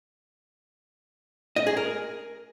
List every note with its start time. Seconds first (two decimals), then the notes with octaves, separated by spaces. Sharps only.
1.56 D#5
1.67 G#4
1.77 A#4